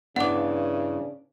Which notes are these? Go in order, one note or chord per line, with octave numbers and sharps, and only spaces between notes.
G2 C#3 E3 B3 D4 F#5 D6